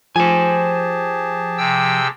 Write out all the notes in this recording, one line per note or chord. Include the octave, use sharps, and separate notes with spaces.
F3 G4 G#4 C5 G#5 A5
C3 G5 E6